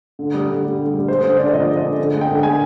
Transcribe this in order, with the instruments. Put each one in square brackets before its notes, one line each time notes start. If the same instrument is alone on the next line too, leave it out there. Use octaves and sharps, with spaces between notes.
[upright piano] D3
G3
D3
G3
D3
G3
G#3 C5
D3 C5
D3 D5
F3 D#5
G#3
D#5
D3
D3
G#3
G5
D3
G#3 G#5